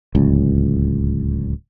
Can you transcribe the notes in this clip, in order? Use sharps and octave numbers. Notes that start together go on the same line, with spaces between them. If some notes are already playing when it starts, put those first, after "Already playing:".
D1 C#2